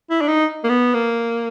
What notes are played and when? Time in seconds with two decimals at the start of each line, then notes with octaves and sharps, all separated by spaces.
0.10 E4
0.21 D4
0.28 D#4
0.64 A#3
0.69 B3
0.94 A#3